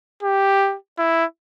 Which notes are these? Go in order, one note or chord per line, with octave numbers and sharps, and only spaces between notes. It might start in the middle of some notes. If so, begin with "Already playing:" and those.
G4
E4